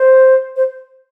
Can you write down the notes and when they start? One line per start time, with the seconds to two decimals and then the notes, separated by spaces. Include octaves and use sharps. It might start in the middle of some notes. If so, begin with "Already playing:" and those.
Already playing: C5
0.56 C5